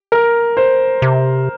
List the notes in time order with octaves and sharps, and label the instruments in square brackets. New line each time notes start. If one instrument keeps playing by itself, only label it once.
[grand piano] A#4
C5
[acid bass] C3